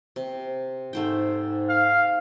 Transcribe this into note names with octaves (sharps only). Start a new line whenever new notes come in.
C3
G#2 A3 C5 G5
F5